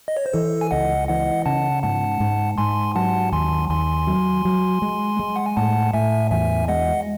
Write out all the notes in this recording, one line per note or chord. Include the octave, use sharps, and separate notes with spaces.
D#5
C#5
C5
E3 A4
G#5
C#2 D#5 F#5
E3 D#5 F#5
C#3 F#5 A5
G#2 F#5 A5
G#2
G#2 G#5 C6
F#3 F#5 A5
D#2 G#5 C6
D#2 G#5 C6
F#3
F#3
G#3
G#3
F#5
G#5
A2 F#5 A5
A2 E5 G#5
E2 E5 G#5
G#3 D#5 F#5